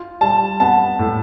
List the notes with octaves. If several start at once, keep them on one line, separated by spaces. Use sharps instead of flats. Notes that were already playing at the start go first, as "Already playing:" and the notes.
Already playing: F4
G3 A5
B3 A5
A2